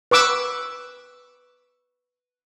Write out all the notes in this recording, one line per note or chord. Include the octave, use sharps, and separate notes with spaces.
B4 C#6 D6 E6